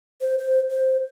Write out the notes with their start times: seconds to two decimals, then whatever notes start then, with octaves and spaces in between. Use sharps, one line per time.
0.21 C5
0.39 C5
0.70 C5